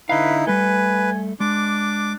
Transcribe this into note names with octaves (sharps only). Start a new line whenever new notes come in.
D3 D#4 E4 B4 F5
G3 A3 B4 G#5
G#3 D4 D6